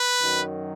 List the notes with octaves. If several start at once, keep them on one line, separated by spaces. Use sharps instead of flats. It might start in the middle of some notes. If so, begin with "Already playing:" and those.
Already playing: B4
F#2 D#3 F#3